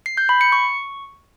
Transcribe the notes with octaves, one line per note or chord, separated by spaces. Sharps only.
C7
G6
B5
C#7
C#6